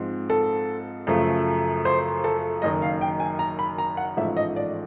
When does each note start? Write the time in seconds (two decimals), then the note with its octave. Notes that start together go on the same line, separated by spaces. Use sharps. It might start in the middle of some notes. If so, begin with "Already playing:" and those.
Already playing: G#2 F3 G#3 C4
0.30 A4
1.07 F#2 C#3 F3 A3
1.85 C5
2.24 A4
2.62 F#1 F#2 D#3 D#5
2.82 F5
3.01 G5
3.20 G#5
3.39 A#5
3.59 B5
3.78 A#5
3.97 F#5
4.17 A1 G#2 F3 A3 C#4 E5
4.37 D#5
4.56 D5